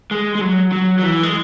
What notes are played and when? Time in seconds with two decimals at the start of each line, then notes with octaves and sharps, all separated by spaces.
0.11 G#3
0.35 G#3
0.41 F#3
0.72 F#3
0.99 F#3
1.03 E3
1.23 G#3